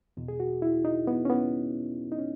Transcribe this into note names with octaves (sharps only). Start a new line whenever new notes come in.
E2 B2
G#4
F#4
E4
D#4
B3
C#4
B3
D#4
C#4